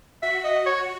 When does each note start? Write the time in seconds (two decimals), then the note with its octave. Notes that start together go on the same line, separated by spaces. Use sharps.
0.22 F#4 E5
0.44 D#5
0.66 C#5